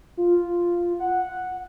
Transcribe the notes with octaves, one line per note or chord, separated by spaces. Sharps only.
F4
F#5